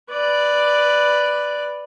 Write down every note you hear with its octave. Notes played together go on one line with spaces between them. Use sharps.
B4 D5